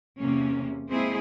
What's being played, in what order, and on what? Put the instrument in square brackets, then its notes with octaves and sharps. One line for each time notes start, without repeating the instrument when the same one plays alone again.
[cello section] E2 C3 A#3 C#4
G#3 A#3 C4 E4 G#4 C5